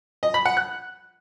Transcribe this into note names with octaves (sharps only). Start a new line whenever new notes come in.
D#5
B5
F#5
F#6